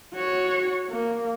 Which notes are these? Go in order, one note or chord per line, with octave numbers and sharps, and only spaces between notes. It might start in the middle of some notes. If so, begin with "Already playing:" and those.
F#4 C#5
A#3